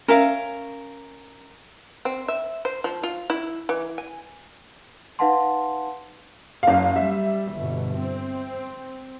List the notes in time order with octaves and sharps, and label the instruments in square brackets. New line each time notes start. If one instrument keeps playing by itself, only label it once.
[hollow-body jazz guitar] C#4 E5 F5 [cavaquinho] A#4
[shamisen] C4
E5
C5
F3
F4
E4
E3
G#5
[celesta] D#4 B4 F5 F#5 A5 C6
[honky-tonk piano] F#1 F5
[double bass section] G3 [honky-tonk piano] E5
[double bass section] G1 B2
C4